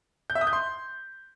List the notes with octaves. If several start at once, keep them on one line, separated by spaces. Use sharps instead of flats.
G6
E5
D#6
G6
C6